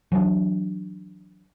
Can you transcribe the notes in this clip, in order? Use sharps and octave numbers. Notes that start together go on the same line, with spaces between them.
E3 F#3 C#4 D4